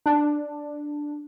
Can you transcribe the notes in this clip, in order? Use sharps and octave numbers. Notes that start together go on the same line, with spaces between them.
D4